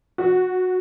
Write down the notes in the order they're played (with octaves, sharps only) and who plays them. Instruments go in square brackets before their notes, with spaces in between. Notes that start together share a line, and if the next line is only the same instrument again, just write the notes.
[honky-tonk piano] F#4